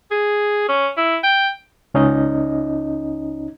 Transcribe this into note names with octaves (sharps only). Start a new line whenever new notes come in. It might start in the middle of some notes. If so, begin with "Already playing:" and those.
G#4
C#4
E4
G5
C#2 C#4 D#4 D#5